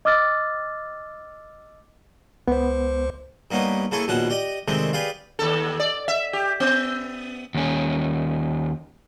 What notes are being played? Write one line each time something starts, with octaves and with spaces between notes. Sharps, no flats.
D#5 D6 E6 F6 A6
C#2 B3 C5
G2 A#3 B3 C#4 D#4
C#3 A#3 E4 A4 G#5 C#6
A#1 B2 D#3 C#4 F#5 A5
G4 D5 D#5
C3 D#3 G#3 A3 C4 D4
G4 G#4 B4 D5 F5
D#2 A4
D5
E5
G4
B3
D#2 C#4